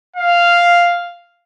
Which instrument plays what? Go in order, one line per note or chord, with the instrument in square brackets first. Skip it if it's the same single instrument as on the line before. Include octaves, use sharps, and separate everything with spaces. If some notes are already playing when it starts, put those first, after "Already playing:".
[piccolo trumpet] F5